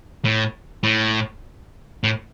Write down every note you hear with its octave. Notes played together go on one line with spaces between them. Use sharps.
A2
A2
A2